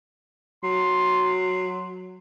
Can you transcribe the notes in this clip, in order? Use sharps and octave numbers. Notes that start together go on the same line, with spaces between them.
F#3 C6